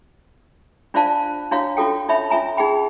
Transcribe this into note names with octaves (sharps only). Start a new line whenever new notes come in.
D4 F4 C5 D5 F5 A5
D4 E4 F#4 C#5 F5
C#4 F4 F#4 A4 G5
D#4 C#5 E5 B5
C#4 F4 E5 G#5 A#5
D#4 G#4 F#5 G5 B5